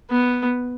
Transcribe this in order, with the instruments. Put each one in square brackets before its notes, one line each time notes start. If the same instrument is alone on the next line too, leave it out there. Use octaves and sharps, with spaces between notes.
[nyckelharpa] B3